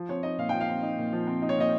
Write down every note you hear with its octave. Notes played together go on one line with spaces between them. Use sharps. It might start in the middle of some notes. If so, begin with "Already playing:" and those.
Already playing: F3
C4 C#5
D#4 D#5
A#2 F5
F3 G5
F5
C4
D#4
A#2
F3
C4
D#4
C#5
A#2 D#5